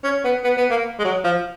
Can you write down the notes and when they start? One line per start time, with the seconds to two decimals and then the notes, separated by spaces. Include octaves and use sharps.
0.04 C#4
0.24 B3
0.44 B3
0.57 B3
0.71 A#3
0.99 G#3
1.05 F#3
1.24 F3